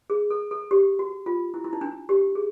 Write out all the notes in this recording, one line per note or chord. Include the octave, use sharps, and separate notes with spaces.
G#4
A4
A4
G4
F#4
F4
E4
E4
D#4
D4
G4
G#4